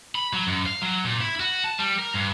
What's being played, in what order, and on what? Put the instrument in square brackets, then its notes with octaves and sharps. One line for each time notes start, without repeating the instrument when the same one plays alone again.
[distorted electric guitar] B5
F#3
F#2
F5
F#3
A#2
E4
F#4
A5
G3
A#4
G2